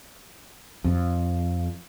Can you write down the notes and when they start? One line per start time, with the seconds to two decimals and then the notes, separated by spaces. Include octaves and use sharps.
0.84 F2